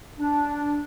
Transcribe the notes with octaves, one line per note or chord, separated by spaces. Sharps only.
D4